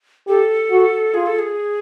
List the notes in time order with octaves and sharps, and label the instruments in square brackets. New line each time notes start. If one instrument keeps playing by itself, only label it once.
[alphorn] G4 [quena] A4
[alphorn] F#4
[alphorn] F4 [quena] G#4
[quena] A4
G#4